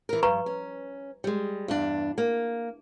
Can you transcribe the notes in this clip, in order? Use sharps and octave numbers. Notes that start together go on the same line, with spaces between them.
E3 A#4
G2 B4 A#5 C#6
C#4
G3 G#3
E2 G2 D4
A#3